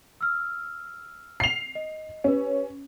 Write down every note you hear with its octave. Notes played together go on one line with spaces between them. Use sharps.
E6 F6
C7 F7
D#5
C#4 G4 B4